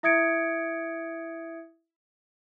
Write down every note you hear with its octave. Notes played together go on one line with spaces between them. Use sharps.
E4 E5 D#6 G#6 C#7 D7